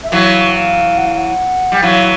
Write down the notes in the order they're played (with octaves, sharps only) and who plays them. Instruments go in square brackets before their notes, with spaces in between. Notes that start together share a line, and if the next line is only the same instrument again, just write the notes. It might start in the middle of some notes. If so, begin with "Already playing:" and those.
[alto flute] E5
[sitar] E3 F#3 [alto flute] F5
[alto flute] F5
F#5
F5
F#5
[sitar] G3
[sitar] E3 F#3 [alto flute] F5